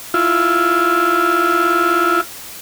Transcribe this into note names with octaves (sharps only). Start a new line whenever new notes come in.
E4 F4